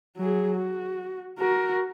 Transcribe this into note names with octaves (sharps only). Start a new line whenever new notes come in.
F#3 G#4
F#4
F#4 A#4